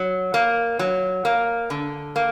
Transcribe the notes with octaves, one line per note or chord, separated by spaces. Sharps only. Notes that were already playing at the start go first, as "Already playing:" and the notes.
Already playing: F#3
A#3
F#3
A#3
D3
A#3